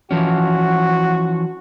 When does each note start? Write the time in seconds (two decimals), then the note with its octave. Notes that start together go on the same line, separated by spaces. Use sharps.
0.11 E3 F3 C#4 F#4